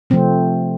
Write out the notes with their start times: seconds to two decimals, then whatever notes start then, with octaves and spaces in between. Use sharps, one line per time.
0.10 C3 F3 A3 C4